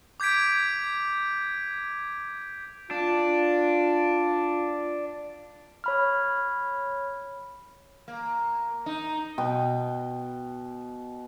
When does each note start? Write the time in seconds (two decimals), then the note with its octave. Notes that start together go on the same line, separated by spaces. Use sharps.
0.20 D6 G6 G#6 B6 D7
2.91 D4 F4
5.84 C#5 B5 F6
8.08 A#3
8.86 D#4
9.38 B2 G5